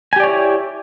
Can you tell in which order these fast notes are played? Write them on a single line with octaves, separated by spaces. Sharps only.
G#5 G4 D5 C#5 E4